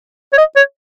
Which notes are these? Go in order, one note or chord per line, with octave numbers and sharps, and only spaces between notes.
C#5
D#5
C#5